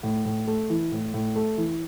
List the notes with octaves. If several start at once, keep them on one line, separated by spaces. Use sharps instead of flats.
A2
A2
A3
E3
A2
A2
A3
E3